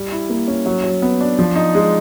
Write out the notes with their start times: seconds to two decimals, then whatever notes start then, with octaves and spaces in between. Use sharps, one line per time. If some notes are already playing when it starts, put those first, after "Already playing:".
Already playing: G3
0.11 E4
0.29 A#3
0.48 C#4
0.66 F#3
0.83 F#3
1.02 B3
1.21 D4
1.39 F3
1.56 D#4
1.75 G#3